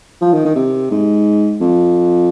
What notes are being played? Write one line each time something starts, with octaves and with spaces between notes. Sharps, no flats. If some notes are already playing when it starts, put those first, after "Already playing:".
F3
D#3
D#3
C3
G#2
F2